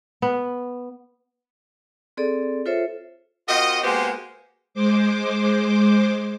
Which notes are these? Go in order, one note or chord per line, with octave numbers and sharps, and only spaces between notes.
B3
C4 G#4 A4 D5
F4 A4 C5 C#5 E5
C4 F4 F#4 A#4 D#5
G#3 A#3 B3 F#4 G4 C5
G#3 C5 D6